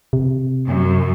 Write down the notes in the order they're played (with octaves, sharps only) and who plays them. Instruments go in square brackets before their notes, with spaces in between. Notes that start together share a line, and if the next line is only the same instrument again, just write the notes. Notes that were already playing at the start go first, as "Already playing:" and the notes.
[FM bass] C3
[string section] F#2